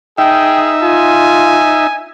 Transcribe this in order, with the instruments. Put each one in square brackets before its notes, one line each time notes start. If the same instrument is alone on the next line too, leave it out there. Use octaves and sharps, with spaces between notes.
[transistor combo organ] D#4 E5 [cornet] G#4 [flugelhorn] G5
[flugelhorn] F4 [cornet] G#5